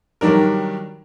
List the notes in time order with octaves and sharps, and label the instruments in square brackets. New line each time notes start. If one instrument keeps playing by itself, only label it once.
[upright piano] D#3 F#3 G3 D4 A#4